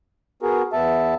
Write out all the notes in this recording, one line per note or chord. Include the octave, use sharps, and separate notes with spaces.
B3 F#4 G#4 A#4
E2 B3 E5 A5